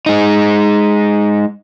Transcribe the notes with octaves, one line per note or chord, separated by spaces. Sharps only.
G#3 D#4